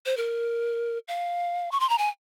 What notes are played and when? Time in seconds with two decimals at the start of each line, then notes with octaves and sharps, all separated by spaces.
0.06 C5
0.17 A#4
1.08 F5
1.72 C#6
1.80 C6
1.89 A#5
1.98 G#5